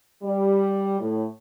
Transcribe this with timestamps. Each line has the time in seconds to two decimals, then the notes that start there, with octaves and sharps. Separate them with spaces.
0.23 G3
1.00 A2